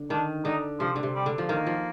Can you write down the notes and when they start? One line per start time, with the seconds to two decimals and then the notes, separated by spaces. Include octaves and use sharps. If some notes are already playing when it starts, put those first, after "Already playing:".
Already playing: D3
0.10 D#3 D4
0.44 D3 D#4
0.80 C3 F3
0.96 D3
1.03 C3
1.15 G3
1.26 D3
1.38 F3
1.49 D#3 A#3
1.67 F3